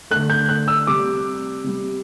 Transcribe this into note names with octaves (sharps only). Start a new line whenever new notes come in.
D3 A3 F#6
G6
F#6
E6
C3 G3 D6
C3 G3